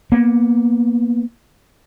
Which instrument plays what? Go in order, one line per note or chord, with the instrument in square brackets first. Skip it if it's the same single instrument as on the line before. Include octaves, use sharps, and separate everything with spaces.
[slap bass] A#3 B3